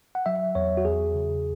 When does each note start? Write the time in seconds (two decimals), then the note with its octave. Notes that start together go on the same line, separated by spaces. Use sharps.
0.15 F#5
0.26 F#3 E5
0.55 E2 C#5
0.77 F#4
0.85 E2 G#4
1.14 C#3